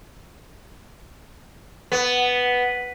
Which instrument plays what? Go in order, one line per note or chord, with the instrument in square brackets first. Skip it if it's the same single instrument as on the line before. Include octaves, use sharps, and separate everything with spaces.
[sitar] B3